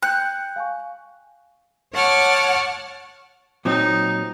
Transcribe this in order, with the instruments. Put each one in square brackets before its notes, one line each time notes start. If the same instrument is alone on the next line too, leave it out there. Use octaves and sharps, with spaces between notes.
[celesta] G5 G6 C#7 [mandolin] F#6
[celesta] F5 G#5 C#6
[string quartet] C#5 F#5 A5 C#6 D6 F6
[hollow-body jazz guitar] A#2 F#3 C4 [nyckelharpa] D#4